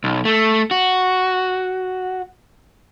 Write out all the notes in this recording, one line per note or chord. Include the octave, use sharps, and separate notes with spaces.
B1
A3
F#4